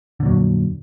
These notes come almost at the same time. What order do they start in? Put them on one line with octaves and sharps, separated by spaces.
D3 A#2 F#3 F2